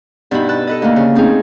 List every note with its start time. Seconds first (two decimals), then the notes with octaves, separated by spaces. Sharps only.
0.31 G2 B2 D#4 E4 B5
0.49 B4 A5 F#6
0.67 A4 B4 D#5
0.82 D2 A#3
0.96 C#3
1.15 A3 C4 C#4 D#4 G#4